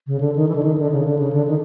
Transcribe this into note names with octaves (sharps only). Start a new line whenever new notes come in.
C#3
D3
D#3
E3
D3
D#3
D3
C#3
D3
C#3
D3
D#3